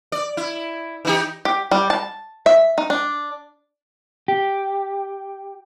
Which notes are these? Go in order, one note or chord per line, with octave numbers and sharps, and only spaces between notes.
D5
E4
E3 D#4 G4
G4
G3
A5
E5
D#4
D4
G4